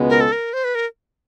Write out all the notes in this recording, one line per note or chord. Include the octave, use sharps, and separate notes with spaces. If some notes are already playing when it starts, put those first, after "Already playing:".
Already playing: C#2 B2 G#3 B3
A#4
A4
A#4
C5
B4
A#4